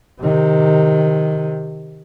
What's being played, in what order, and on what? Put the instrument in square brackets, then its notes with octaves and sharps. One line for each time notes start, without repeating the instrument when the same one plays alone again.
[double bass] C3 D#3